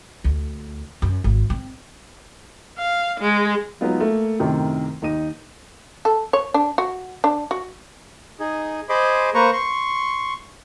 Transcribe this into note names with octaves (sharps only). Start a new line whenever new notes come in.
D2
F#2
G#1
C4
F5
G#3
F#3 G#3 B3 D#4 F4
A3 A#3
F#2 A2 C3 D#3
D#2 D#4 D#7
A4
C#5
D4
F#4
D4
F#4
D#4 G#4
G#4 C5 D#5 B5 C6 D6
A#3 B4 C5 A#5 C#6
C6 C#6